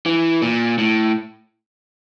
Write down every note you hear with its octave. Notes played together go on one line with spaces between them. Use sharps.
E3
A#2
A2